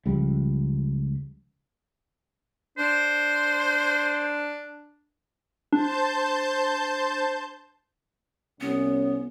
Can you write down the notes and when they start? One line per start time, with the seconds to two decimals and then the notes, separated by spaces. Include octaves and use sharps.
0.05 C#2 F3 G3
2.78 D4 C5
5.73 D4 C5 A5 G6
8.61 C2 B3 C#4